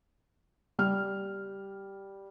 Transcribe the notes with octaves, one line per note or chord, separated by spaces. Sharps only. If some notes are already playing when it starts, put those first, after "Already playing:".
G3 F6